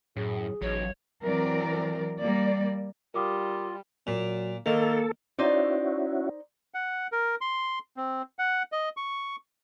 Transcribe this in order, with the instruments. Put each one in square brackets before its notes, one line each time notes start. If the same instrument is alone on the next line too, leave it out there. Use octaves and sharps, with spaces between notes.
[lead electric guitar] F#2 [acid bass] A2 [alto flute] G#4
[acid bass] A1 [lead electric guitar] F#3 D#4 [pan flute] C#5
[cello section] E3 F#3 C4 A#4 D5
G3 A#3 D5
[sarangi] G3 [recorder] F4 [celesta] A#4 D6 D#6
[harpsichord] A#2 [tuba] F#3
[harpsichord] D#3 [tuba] A#3 [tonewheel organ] A4
[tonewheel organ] C#4 E4 F#4 [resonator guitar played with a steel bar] D#4 C5 D5
[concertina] F#5
A#4
C6
C4
F#5
D#5
C#6